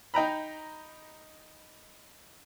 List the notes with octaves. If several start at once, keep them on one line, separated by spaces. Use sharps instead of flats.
D#4 G5 A#5 B5